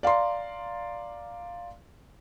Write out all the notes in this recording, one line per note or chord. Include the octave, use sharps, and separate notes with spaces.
D5 F5 A#5 C6